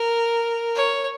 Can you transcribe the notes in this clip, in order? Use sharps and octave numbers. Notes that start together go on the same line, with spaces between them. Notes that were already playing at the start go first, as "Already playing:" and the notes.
Already playing: A#4
C#5